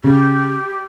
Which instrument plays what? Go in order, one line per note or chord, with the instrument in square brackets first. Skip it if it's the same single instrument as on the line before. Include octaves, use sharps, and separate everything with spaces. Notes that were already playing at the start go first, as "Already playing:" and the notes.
[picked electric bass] C#3 [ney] G4